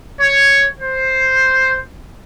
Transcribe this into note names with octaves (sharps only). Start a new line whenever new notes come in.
C#5
C5